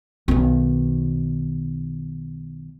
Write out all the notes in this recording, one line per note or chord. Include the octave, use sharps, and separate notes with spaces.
B1 D#3